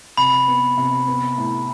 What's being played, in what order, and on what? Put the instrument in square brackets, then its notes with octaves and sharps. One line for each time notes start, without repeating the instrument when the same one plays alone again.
[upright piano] C3 [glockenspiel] B5
[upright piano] B3
C3
B3
A2